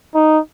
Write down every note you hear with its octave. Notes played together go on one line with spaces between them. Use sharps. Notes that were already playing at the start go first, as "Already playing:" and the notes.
D#4